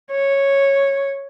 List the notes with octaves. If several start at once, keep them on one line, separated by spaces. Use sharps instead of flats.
C#5